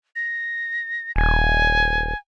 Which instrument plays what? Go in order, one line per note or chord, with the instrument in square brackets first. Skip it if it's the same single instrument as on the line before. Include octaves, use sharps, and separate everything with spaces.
[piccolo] A#6
[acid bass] D#1 [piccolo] G#5